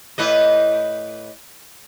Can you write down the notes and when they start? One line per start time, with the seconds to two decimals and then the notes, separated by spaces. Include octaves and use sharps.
0.18 A2 B4 D#5